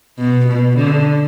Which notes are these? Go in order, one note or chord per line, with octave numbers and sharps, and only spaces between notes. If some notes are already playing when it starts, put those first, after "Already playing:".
B2
B2
D3